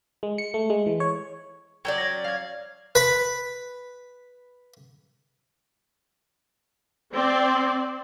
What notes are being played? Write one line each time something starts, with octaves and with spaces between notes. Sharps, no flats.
G#3
C#7
A3
G#3
E3
C#5
F#3 C#4 D5 G5 G#6
G#6 A#6
F5 G#6
B4 B5
C4 D5